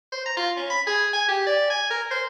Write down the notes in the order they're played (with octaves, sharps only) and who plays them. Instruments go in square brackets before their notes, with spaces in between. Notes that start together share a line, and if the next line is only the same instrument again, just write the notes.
[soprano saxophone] C5
A#5
F4
C#4
B5
G#4
G#5
G4
D5
G#5
A#4
C5